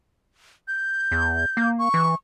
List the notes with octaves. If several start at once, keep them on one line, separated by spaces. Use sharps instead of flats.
G6
E2
A#3
C#6
E3